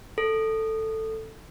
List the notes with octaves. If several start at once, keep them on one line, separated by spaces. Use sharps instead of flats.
A4